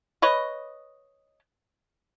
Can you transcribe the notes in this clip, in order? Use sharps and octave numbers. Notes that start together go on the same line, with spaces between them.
B4 C#5 D#5